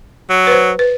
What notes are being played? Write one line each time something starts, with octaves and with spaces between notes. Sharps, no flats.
F#3
B4 C5
B4